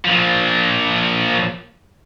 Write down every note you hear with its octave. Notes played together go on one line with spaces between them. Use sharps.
A#2 F3